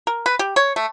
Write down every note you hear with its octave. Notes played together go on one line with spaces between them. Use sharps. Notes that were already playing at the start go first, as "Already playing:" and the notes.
A#4
B4
G4
C#5
A3